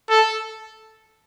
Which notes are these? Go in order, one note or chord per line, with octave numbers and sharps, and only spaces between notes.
A4